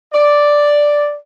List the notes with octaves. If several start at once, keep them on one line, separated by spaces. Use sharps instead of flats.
D5